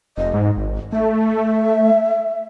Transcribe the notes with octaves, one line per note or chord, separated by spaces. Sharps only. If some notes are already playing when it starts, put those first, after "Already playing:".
F1 D#5
G#2
G#1
A3 E5